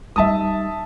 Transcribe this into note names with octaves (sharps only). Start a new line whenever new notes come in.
G3 D#4 E5 A5 D#6